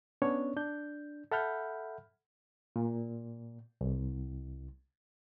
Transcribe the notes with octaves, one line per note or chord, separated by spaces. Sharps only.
B3 C#4 D4 C#5
D4 G6
A4 E5 F#5 B5 F6 G6
A#2
C2